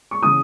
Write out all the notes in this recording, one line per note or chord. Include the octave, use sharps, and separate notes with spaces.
C#6
C#3 E3 D#6